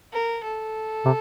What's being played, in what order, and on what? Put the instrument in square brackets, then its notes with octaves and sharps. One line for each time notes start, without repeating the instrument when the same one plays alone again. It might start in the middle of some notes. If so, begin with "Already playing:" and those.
[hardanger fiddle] A#4
A4
[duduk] C3